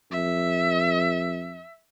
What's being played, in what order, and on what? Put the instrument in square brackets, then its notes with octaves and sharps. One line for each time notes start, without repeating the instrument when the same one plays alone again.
[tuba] F2 [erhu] E5